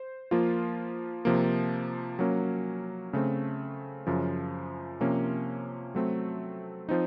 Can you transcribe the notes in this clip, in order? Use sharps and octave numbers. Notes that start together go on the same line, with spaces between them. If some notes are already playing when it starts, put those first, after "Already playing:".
Already playing: C5
F3 A#3 F4
C3 F3 A#3
F#3 A#3 C#4
C#3 A3 C4
F#2 C#3 F3
C3 F3 A#3 C#4
F#3 A3 C4
F3 C4 D#4